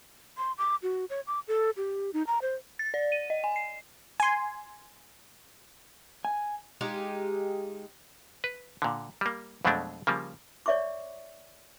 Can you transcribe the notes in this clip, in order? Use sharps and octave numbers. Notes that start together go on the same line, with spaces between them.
C6
D6
F#4
C#5
D6
A4
G4
D#4
A#5
C5
A6
D5
D#7
D#5
G#5
C7
G#5 C6
G#5
G#3 D#4 F4 G4
B4
A#2 D3
G3 A#3
F2 B2 F#3 G#3 A3 D4
C#3 F3 G3 A#3
C#5 D5 E5 C#6 D6